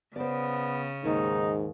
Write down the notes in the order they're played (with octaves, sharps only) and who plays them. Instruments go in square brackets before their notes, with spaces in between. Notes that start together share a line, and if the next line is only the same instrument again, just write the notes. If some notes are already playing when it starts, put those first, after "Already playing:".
[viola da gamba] C#3 [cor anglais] B3 [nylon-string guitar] C5 D5
[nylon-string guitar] D#2 [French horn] G#2 [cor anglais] D#4